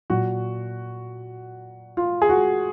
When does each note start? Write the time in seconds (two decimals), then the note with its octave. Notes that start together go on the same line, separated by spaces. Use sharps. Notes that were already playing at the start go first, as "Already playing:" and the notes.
0.10 A#2 F#3 F#4
1.97 F4
2.22 G#4
2.29 F#4